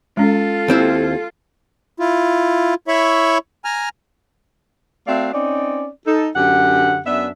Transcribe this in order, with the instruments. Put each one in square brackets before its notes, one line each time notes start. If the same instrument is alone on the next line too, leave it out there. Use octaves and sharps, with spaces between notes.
[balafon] G#3 C#4 [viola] F4 A4
[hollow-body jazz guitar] D#2 C4 E4
[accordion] E4 F4
E4 C#5 E5 B5 C#6
G#5 A#5 F6
[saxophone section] A3 C4 F#4 D5 E5 F5
C4 C#4 D#4 D5
D#4 A4
F#2 D3 G4 F#5
F#2 B3 D4 E5